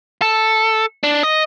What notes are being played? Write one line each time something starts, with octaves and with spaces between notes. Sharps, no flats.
A4
D4
D#5